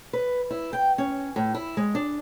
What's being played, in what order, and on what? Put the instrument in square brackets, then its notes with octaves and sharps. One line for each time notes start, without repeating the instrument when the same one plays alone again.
[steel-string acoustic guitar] B4
E4
G5
C#4
A2
E4
G#3
D4